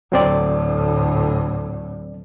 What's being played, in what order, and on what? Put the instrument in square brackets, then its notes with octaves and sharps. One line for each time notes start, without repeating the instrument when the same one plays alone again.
[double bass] D2 A2 [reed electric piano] F#3 C4 D5